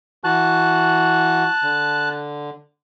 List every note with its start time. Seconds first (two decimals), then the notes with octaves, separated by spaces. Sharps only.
0.24 E3 F#4 A5 F#6
1.63 D3